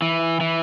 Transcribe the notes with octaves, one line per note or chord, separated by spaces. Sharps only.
E3
E3